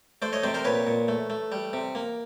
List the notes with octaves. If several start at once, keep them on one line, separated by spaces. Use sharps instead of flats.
A3 C5 D5
C#5 D#5
C3 C5 D5
A#4 C5
A#2 B4 C#5
A#2
A3
A3
G3
C3
A#3